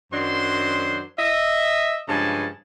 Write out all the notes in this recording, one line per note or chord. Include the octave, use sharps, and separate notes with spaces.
F#2 D#3 F#3 D4 C5 C6
D#5 E5
G2 C#3 F3 G#3 G#5 A5